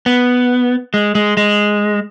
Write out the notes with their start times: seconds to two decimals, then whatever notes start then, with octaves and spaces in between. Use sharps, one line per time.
0.06 B3
0.94 G#3
1.15 G#3
1.37 G#3